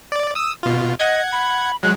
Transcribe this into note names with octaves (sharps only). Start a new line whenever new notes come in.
D5
D#6 E6
B2 F4
D#5 F#5 G#6
B5
F#3 G#3 F#6